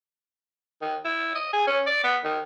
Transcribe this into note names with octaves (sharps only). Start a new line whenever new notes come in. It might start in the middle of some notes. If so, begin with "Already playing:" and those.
D#3
E4
D#5
G#4
C#4
D5
B3
D#3